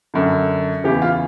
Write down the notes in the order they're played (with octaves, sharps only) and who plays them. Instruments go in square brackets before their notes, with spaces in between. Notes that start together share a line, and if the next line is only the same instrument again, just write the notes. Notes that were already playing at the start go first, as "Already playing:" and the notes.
[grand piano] F#2 D3
E2 C#3 E3 G4
F4